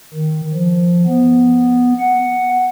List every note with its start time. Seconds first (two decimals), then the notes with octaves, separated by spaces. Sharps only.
0.14 D#3
0.54 F3
1.06 B3
1.99 F#5